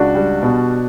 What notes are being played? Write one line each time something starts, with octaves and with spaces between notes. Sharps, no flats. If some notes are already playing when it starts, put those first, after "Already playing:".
Already playing: C#2 D4 F#4
G3
B2